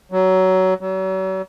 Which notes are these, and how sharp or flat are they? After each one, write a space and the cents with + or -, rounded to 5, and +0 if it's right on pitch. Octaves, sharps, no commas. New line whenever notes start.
F#3 +20
F#3 +40